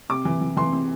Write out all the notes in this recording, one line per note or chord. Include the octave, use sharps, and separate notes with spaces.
C3 D6
E3
E3
E3 C6
C4